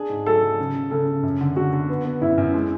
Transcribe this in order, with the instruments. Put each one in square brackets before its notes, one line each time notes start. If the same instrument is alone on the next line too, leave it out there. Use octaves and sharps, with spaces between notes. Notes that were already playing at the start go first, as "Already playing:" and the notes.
Already playing: [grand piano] D4 [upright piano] G#4
[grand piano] G#2
[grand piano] F#3 [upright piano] A4
[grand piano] F#3
C#3
C#3
[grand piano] C#3 [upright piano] A4
[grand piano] C#3
F#2
D3
[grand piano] D3 [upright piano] F#4
[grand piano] D3
B3
B3
[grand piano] F#2 [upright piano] E4
[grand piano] F#2
G#3